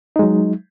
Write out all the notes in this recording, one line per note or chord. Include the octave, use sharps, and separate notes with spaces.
F#3 G#3 D#4